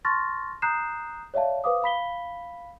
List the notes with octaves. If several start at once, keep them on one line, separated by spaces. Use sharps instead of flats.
A5 C6 C#6 F6 A6 A#6
A#5 D#6 F#6 G6 C7 E7
C#5 D5 E5 F5 A5
B4 C5 F5 D6 D#6
F5 B5 B6 G7